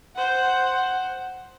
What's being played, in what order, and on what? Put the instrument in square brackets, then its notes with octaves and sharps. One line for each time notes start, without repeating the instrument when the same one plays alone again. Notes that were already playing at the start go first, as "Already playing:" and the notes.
[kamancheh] C5 F#5